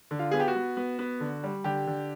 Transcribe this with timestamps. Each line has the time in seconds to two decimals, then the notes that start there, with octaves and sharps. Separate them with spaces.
0.11 D3
0.19 F4
0.31 B3 G#4
0.40 G4
0.48 F#4
0.56 B3
0.77 B3
0.99 B3
1.20 D3
1.43 G3
1.64 D3 G4
1.87 D3